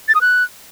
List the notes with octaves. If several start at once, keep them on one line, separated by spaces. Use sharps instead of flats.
A6
D#6
F#6